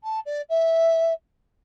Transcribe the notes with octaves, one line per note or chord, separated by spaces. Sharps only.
A5
D5
E5